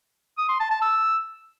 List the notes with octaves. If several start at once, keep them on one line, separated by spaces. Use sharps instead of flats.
D#6
C6
A5
A5
E6